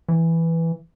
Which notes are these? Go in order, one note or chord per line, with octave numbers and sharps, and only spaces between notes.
E3